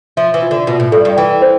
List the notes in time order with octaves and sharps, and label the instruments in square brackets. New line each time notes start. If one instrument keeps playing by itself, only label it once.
[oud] F3 [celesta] E5
[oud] E3
[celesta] F4
[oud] D3
[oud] B2 [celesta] F4
[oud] A2
[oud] G2 [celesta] A4
[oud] G2
[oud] E3 [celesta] G5
[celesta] C5